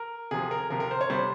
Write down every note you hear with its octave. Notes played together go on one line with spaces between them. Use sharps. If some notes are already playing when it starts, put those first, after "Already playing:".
Already playing: A#4
C3 F3 G#4
A#4
C3 F3 A#4
A#4
C5
C#5
C3 G3 C5